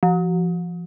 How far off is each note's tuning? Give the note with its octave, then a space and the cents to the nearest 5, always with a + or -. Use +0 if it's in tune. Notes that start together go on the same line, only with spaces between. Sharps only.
F3 -20